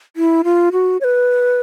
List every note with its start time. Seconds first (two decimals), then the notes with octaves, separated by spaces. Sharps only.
0.16 E4
0.44 F4
0.72 F#4
1.01 C#5
1.04 B4